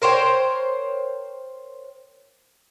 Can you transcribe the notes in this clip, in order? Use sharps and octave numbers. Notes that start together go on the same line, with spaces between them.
A#4 C5 C#5 G5